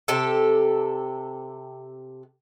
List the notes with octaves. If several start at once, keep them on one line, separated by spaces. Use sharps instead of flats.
C3 G4 A4